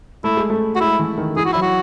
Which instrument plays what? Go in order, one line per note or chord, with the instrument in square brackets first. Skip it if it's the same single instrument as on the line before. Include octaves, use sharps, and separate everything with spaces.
[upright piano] A3 [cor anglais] E4
[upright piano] G#3
A3
[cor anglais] F#4
[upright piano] G#3 [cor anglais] E4
[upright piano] E3
D#3
[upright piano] E3 [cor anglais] G#4
[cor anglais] F#4
[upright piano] F#3 [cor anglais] E4
[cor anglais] F#4